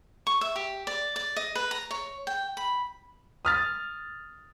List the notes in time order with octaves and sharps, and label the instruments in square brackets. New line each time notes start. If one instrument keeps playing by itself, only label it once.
[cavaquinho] C#6
E5
G4
D5
D5
D#5
B4
A#5
C#5
G5
B5
[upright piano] D#6 F6 A6